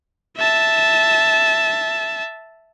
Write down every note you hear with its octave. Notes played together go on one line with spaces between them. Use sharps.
E5 A5